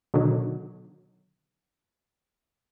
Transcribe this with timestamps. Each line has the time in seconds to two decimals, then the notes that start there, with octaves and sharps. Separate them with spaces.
0.14 B2 D3 D#3 F#3